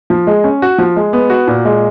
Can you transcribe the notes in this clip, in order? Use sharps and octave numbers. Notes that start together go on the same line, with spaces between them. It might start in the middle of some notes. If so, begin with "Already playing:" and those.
F3
G#3
C#4
F#4
F3
G#3
B3
F#4
A#2
G#3